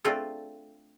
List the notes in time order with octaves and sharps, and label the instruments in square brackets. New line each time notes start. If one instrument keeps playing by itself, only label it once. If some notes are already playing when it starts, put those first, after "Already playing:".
[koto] A3 C4 D4 F4 A4